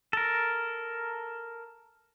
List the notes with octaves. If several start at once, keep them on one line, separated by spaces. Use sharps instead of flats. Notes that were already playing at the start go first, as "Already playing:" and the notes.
A4 A#4